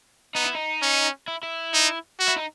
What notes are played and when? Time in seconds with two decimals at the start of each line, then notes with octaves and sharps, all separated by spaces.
0.35 B3 D#4
0.44 E4
0.55 D#4
0.82 C#4
1.28 E4
1.43 E4
1.74 D#4
2.19 F#4
2.28 E4
2.37 D#4